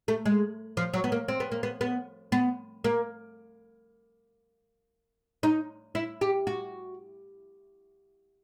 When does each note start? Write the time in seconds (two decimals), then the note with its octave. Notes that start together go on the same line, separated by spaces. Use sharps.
0.08 A3
0.26 G#3
0.77 F3
0.94 F#3
1.04 B3
1.12 A#3
1.28 C4
1.40 B3
1.52 A#3
1.63 B3
1.81 B3
2.32 B3
2.84 A#3
5.43 D#4
5.95 E4
6.21 G4
6.47 F#4